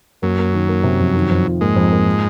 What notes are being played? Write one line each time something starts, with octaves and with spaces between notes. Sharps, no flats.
F#2 F#3 A#3
A#3
D#3
A#3
C3
F2
D#3
F2
F4
G#2 G#3 A#3
F2
A#3
F3